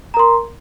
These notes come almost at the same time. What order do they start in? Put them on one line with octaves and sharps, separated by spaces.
A#5 A#4 C6